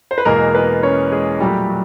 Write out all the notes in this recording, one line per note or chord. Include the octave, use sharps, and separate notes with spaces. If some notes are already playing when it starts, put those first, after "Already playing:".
C5
B4
E2 B2 G#3 A#3 A#4
B3 B4
C#4 C#5
G#3 G#4
A#2 F#3 G3 A3 G4
F#3